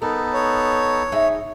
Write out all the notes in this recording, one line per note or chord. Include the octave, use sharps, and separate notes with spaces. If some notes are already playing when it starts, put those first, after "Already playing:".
B3 D#4 A4 A#4
C#5
D#4 G#4 E5